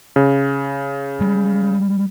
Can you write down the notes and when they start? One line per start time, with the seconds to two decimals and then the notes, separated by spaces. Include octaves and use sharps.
0.16 C#3
1.21 G3 G#3